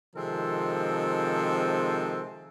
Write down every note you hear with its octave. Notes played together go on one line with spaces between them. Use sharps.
C3 D#3 F3 G#3 C4 A4